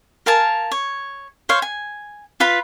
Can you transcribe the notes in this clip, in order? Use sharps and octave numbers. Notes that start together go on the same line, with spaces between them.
A#4 F5 G#5 A5
C#5
C5 C#5 F5
G#5
F4 B4 F5 B5